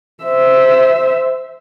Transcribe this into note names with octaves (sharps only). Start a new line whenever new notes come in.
C5 E5